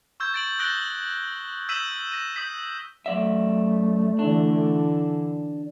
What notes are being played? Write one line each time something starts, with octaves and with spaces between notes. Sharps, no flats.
C#6 E6 G6 G#6
A6 D7 F#7
D#6 F#6 A6 A#6 D7 G7
E6 G6 B6 D#7 E7 F#7
A#6 D#7
D#6 G6 B6
F#2 A3 D5 E5
D3 E3 D4